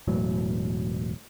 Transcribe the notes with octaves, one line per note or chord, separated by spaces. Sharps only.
E1 A2 F#3